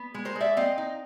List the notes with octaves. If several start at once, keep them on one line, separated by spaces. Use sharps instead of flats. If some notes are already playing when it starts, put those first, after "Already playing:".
Already playing: B3
G#3
A#4 C5
G#3
D5 E5
C4 D#5 F5
D#4